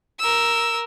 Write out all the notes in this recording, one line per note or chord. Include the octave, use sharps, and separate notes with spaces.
A#4 E6